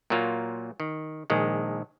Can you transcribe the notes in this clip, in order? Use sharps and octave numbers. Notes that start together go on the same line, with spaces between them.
A#2 F#3 A#3 F4
D#3
A#1 D#3 G#3